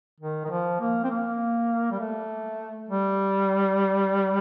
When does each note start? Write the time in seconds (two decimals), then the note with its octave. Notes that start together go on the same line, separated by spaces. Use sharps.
0.20 D#3
0.45 D#3
0.50 F3
0.80 A#3
1.04 C4
1.10 A#3
1.91 G3
2.00 A3
2.89 G3